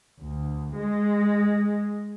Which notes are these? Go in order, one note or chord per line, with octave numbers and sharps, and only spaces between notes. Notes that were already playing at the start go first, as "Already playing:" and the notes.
D2
G#3